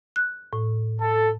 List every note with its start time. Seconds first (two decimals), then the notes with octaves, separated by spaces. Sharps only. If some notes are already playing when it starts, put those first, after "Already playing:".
0.16 F#6
0.53 A2
1.01 A4